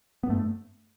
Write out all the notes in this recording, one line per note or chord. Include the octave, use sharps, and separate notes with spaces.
B3
G2 A3